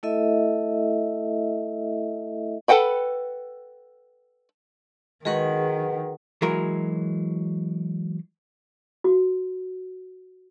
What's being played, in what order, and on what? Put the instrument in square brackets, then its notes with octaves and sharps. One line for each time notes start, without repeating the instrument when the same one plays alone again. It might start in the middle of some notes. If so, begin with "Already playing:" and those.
[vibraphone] A3 E4 A4 D#5 E5
[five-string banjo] A4 B4 F#5 G5 B5
[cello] D#3 [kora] G#3 D#4 F#4 [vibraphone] G#4 B4 F#5
[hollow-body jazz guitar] E3 F#3 G#3 F#4 A#4
[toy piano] F#4